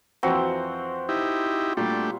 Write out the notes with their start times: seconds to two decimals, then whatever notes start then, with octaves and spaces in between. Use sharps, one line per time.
0.23 F2 E3 C4 F#4 C5
1.09 D#4 E4 G4
1.77 A#2 G3 A3 D4 G4